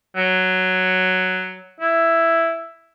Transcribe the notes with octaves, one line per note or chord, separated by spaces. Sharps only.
F#3
E4